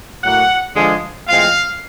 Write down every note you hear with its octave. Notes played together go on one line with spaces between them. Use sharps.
A2 F#3 A#3 F#5
D3 F3 G#3
A2 F3 G#3 C4 F5